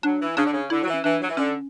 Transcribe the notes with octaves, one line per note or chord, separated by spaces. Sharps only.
F#3 D4
E3
C#3 D4
D3
C#3
D3 E4
F#3
E3
C#4
E3 D4
F#3
E3
D3 C#4